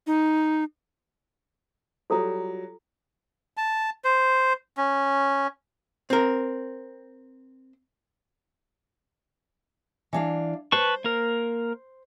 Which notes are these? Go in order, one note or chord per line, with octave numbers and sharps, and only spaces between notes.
D#4
F#3 G3 F4 A4 A#5
A5
C5
C#4
C4 A#4
E3 D4 F5
B4 C5 A5 C#6
A#3 A#4